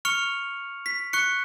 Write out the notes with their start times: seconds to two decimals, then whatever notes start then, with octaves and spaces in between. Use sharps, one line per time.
0.05 C#6 F6 C#7 F7
0.86 B6
1.13 C#6 F#6 C#7